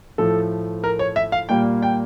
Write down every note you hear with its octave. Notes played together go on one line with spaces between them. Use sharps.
A2 F3 A3 A4
A#4
C#5
E5
F5
A#2 G3 A#3 G5
G5